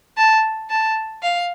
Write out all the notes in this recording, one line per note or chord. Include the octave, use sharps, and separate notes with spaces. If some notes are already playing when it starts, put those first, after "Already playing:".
A5
A5
F5